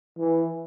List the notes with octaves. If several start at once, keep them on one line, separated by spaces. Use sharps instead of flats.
E3